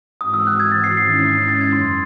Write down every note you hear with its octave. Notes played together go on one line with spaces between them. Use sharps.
G#2 E3 C4 F#4 D#6
E6
F#6
G#6
A6
C7
G#2 D#3 G#3 C#4 E4 C7
A6
C7
A6
G#6
F#2 C#3 E3 C6